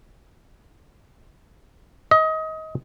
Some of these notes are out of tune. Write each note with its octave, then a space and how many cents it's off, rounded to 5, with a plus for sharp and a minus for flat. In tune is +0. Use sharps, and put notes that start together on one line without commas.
D#5 +25